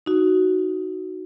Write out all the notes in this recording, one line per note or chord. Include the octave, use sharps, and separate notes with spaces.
D#4 F#4